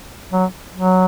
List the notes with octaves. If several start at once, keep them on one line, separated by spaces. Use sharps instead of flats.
F#3
F#3